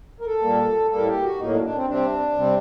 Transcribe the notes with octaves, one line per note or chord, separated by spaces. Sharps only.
A#4
A4
A#2 G3 A#3
A2 G3 A#3 A4
G4
F#4
A2 F#3 A#3 D#4
D4
D4
C4
C3 G3 C4 D4
C3 G3 C4